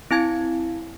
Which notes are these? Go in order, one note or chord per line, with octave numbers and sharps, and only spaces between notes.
C4 E4 G#5 G#6